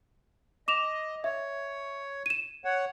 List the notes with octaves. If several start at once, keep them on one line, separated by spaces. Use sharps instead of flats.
D#5 D6 E7 F7
C#5 E5
D#7 E7
C#5 F#5